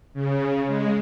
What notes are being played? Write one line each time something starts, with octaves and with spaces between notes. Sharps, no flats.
C#3
G#3